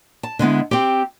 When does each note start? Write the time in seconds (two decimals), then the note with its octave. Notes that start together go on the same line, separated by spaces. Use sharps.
0.23 A5
0.39 D3 G#3 B3 E4
0.71 C4 G4